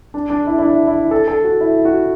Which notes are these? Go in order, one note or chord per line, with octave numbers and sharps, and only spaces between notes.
D4
D4
E4
E4
D4
E4
A4
A4
F#4
E4
F#4